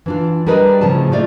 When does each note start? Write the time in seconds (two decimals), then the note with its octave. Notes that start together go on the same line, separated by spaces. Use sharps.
0.06 E3 D4 F4
0.47 G3 D4 G#4 A#4 B4 D#5
0.81 A2 C#3 F3 G#4 A5
1.12 A3 A#3 F4 D5 E5